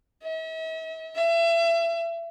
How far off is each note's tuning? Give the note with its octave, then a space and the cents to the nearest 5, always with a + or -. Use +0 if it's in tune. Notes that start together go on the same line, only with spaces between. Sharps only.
E5 -45
E5 +30